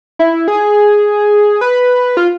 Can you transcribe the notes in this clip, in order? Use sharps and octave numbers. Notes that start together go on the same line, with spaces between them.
E4
G#4
B4
F4